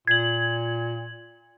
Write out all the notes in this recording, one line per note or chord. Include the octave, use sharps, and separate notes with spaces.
A#2 G#6 F#7